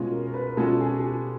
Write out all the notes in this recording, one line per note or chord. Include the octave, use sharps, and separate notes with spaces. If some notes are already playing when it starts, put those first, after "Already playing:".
Already playing: B2 G#3 C#4 F4
A#4
A#4
B4
A#4
B2 G#3 C#4 F4 A4
G#4
G#4
G4